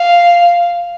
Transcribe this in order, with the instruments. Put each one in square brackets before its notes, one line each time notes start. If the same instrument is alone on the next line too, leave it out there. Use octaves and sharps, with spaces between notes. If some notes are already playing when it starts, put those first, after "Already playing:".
Already playing: [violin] F5